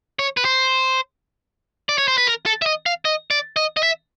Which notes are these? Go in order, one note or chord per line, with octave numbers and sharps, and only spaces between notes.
C#5
B4
C5
D5
C#5
C5
B4
A#4
A4
E5
D#5
F5
D#5
D5
D#5
D#5
E5